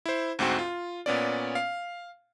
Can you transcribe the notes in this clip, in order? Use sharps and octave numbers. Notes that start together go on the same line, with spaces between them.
E4 C5
D2 G#2 C4 F#4 G5
F4
A#2 B3 C#4 D5
F5